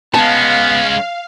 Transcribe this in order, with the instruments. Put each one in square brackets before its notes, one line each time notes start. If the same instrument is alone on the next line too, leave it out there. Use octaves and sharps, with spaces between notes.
[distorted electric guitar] G#3 C#4 [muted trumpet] B3 [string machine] F5 [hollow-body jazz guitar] A5